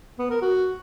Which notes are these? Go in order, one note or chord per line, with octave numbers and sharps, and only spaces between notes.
B3
A#4
F#4